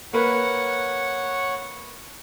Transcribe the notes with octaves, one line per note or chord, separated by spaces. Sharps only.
A#3 B4 C#5 F#5